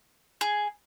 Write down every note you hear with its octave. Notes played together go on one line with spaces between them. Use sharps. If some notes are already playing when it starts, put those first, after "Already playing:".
G#4